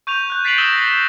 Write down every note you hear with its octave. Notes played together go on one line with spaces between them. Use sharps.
C#6 G6 D#7 F7
F#6 G6
A6 B6 C7 D7 F7 F#7
D#6 E6 A#6 E7 F#7 G7
A#6